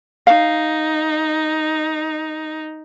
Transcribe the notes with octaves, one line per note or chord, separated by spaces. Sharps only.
D#4 F5